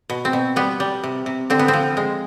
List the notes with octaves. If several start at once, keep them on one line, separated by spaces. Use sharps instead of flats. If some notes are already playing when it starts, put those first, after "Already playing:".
B2
C4
B2
G3 B3
G3
C3
C3
D3 C4
B3
C4
F3
G#3